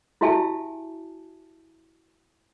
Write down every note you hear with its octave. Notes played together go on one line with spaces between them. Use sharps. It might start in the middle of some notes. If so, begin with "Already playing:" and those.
E4 F#4 G4 E5 G#5 A5